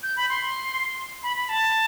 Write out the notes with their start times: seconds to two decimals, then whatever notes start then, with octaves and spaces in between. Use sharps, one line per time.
0.03 G6
0.17 B5
0.29 C6
1.23 B5
1.37 B5
1.49 A5